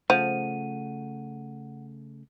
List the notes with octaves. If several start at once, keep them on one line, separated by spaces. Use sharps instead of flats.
C#3 F3 A3 F#5 D#7